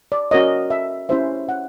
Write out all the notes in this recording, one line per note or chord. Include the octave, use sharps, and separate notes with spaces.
D5
C#4 F#4 A#4 C#5 D#5
E5
C#4 E4 G4 C5 E5
F#5